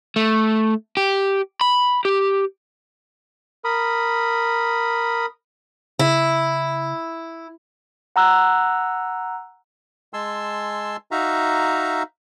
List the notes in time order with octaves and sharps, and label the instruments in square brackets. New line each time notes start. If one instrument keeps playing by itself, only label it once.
[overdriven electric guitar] A3
G4
B5
G4
[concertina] A#4 B5 D#6
[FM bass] C#3 [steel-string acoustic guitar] E4
[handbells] F#5 A#5 E6 F#6
[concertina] G#3 G#5 A5 C6 E6
D#4 F#4 E5 F5 A#5